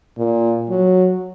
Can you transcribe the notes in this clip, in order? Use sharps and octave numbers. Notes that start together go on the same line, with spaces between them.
A#2
F#3